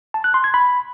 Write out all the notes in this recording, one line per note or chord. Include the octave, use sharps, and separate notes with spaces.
A5
F#6
C6
G#6
B5